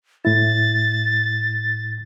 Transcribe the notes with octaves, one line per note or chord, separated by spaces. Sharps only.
A2 E4 A6